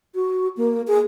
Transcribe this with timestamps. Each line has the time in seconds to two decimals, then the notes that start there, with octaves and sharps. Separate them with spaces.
0.15 F#4
0.57 A#3
0.87 G#4